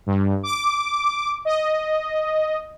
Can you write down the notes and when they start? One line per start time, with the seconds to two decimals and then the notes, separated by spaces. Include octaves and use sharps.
0.06 G2
0.43 D6
1.45 D#5